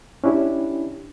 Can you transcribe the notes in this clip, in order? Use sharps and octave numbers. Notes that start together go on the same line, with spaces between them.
C#4 D4 E4 G4